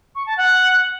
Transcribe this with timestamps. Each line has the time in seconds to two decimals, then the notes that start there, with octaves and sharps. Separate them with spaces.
0.15 C#6
0.26 A5
0.38 F#5